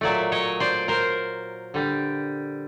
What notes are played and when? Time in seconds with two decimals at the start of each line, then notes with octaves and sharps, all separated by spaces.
0.01 A#2 F#3 A3 D5 E5
0.32 C#5 D#5
0.60 C5 D5
0.88 A#4 C5
1.74 D3 G3